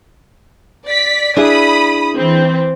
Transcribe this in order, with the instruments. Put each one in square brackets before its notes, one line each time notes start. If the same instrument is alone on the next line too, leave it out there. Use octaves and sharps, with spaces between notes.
[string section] D5 B6
[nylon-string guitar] D4 E4 G#4 [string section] B5 D#6
[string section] E3 C4